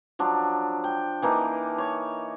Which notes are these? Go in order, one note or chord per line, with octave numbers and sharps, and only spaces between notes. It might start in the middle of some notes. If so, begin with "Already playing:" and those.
F3 F#3 D4
G5
E3 A#3 D4 D#4
C#5